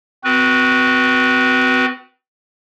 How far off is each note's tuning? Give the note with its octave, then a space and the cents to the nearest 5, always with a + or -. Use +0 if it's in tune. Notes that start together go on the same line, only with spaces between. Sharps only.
C4 -35 F#4 +0 B4 -20